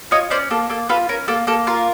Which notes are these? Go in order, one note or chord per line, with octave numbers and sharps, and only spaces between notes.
F4 C#5 D#5
C#4 C5 D5
A#3 A4
A#3 A4
F4 A4 B4
C#4 A#4
A#3 A4
A#3 A4
F4 A#4